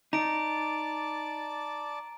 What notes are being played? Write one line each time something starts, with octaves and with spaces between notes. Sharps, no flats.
D#4 D5 A5 A#5 D6 D7